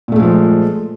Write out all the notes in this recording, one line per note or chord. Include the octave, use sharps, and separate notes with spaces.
A#2 F3 G#3 A3